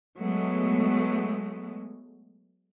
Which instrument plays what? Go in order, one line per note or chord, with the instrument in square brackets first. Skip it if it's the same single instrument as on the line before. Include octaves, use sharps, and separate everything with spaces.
[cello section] F#3 G#3 A3 B3